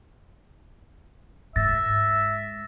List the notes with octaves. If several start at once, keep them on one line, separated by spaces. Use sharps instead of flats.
G#2 E5 A6 A#6